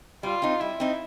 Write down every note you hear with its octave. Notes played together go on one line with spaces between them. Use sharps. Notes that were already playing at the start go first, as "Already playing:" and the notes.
G3 F4
C4 D#4
G3 E4
C4 D#4